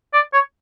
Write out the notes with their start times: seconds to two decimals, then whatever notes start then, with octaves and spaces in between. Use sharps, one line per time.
0.13 D5
0.33 C#5